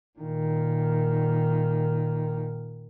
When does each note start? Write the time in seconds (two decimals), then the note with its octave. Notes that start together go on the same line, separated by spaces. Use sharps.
0.19 A#2 D#3